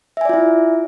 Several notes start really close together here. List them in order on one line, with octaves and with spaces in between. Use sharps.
E5 G#5 D5 F4 E4